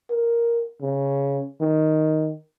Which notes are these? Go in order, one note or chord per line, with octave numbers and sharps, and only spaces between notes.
A#4
C#3
D#3